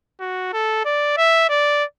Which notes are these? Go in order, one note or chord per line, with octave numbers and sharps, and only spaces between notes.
F#4
A4
D5
E5
D5